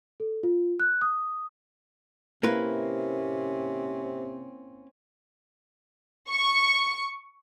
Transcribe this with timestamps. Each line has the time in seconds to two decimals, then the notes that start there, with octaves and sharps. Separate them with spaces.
0.20 A4
0.43 F4
0.80 F#6
1.01 D#6
2.43 C3 A#3 C4 C#4 E4 B4
6.29 C#6